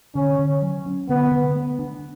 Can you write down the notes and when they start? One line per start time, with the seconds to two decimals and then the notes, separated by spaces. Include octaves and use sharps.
0.15 D3 C#4
0.39 D3
0.62 F#3
0.86 C#4
1.09 D3 B3
1.32 D3
1.55 A3
1.79 D4